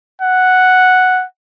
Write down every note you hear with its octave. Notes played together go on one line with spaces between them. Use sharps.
F#5